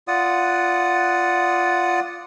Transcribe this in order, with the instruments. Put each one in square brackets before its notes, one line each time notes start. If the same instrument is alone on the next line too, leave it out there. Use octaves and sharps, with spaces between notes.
[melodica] F4 D5 F#5 D#6